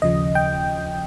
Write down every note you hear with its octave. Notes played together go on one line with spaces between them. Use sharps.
D#2 C#3 F3 D#5
G5